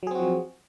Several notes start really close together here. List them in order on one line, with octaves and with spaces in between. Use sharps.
F#3 G#4 C4 F#4 F3